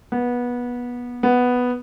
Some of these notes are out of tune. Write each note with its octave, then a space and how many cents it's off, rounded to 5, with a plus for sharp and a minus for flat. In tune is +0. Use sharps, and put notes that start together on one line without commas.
B3 -20
B3 +0